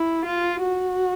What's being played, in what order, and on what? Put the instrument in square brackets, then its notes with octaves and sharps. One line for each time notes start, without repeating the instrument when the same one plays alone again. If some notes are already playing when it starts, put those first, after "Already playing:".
Already playing: [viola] E4
F4
F#4